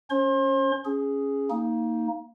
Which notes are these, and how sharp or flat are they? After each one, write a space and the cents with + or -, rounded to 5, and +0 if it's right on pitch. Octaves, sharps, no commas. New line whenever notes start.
C#4 +0 C5 +40 C6 +35
C#4 +0 G#4 +0
A#3 -5 D#4 +20